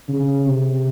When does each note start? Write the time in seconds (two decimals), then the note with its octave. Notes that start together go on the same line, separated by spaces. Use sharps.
0.09 C#3
0.46 C3